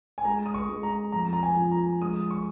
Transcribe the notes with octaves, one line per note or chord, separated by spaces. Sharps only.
G#5
G#3 A#5
D#6
C#6
G#3
A#5
F2 A#5
A#5
G#5
F3
A#5
G#3 D#6
C#6